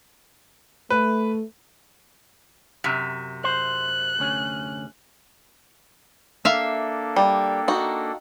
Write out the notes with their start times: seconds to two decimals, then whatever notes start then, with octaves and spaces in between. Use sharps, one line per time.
0.90 A3 B4
2.84 F#2 C3
3.44 C5 F#6
4.19 D2 C#4
6.45 A#3 D4 A4 E5 F5
7.16 G3 G5
7.68 D#4 F#4